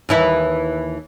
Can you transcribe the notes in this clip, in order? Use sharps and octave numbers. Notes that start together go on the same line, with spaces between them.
D#2 E3 E4